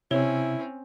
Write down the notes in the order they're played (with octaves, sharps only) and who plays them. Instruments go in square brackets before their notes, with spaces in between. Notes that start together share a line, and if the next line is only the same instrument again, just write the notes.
[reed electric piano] C3 [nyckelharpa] C4 C#4 [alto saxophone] E4 [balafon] C#5